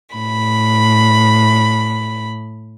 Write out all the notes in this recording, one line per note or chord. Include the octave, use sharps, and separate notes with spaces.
A2 B5